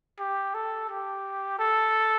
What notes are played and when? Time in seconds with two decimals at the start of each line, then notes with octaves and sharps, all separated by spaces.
0.19 G4
0.54 A4
0.89 G4
1.59 A4